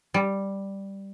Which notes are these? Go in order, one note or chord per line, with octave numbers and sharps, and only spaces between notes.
G3